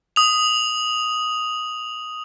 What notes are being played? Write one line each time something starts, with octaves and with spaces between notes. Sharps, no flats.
D#6 F7